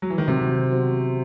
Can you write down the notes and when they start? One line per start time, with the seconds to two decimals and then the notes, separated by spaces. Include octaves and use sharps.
0.02 F#3
0.10 E3
0.18 D#3
0.27 C3 F#3 C4 F#4 C5
0.71 B3 F#4 C5